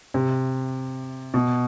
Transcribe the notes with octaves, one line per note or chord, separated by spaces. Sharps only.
C3
B2